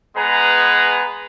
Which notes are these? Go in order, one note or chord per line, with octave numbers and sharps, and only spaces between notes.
G#3 B3 G#4 B4 A#5